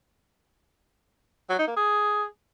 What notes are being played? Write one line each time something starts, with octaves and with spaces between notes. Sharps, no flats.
F#3
D#4
A#3
G#4